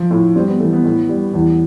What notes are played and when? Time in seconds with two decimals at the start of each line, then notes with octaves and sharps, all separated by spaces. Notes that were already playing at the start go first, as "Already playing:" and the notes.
Already playing: F3
0.11 A2
0.36 G3 C4
0.48 B3
0.59 E3 A3
0.73 B3
0.85 A2
1.09 G3
1.34 E2